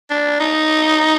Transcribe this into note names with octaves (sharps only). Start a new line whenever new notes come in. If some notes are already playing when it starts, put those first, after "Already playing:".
D4
D#4